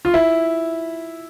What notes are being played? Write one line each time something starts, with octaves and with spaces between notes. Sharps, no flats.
F4
E4